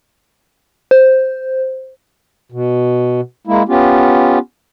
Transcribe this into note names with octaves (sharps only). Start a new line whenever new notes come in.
C5
B2
G#3 A#3 E4
B3 C#4 F4 G4